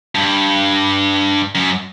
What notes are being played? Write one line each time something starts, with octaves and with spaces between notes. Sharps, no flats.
G2
F#2